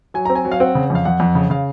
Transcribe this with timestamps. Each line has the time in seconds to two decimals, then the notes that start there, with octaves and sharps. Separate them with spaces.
0.14 F#3 G#5
0.25 C4 A#5
0.35 G#5
0.45 F#3
0.52 F5
0.60 C4 F#5
0.75 C#3
0.90 F2 F5
1.05 F2 F#5
1.20 F2
1.35 C#3
1.50 C#3 F5